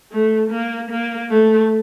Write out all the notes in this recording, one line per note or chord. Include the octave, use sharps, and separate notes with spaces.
A3
A#3
A#3
A3